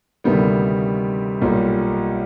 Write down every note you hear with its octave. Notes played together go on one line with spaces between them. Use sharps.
D2 C3 D#3 G3 B3
B1 A#2 G3